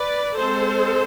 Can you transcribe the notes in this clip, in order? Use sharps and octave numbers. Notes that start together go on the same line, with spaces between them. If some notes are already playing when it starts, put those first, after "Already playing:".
Already playing: B4 D5
G#3 C4 A4 C5